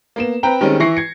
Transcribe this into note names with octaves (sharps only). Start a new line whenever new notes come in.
A#3 B3 E7
C4 B4 G5 A#5
D#3 G3 G#3 C4 C#4
E3 E4 C#6 A#6 C7 C#7
G#6 C#7